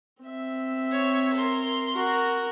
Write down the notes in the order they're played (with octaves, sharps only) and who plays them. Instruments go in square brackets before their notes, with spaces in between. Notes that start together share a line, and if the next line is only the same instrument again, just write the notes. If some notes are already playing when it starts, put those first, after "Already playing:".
[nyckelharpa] C4 E5
[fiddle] C#5
A#4 C6
[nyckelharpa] F#4 [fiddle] A#4